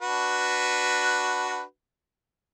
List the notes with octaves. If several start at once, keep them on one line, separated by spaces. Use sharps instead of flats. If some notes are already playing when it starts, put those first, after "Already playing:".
D4 F#4 B4